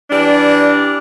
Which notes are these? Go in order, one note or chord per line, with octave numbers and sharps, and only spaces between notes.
E3 G3 D4